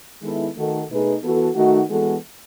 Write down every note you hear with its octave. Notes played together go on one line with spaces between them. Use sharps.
D#3 G#3 B3 E4 A4
D#3 A3 D#4 F#4 A4
B2 A3 D#4 G#4 B4
E3 B3 F#4 A4
D#3 A3 D#4 F#4
E3 G#3 B3 F#4 A4